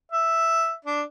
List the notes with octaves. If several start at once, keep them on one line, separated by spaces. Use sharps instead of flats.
E5
D4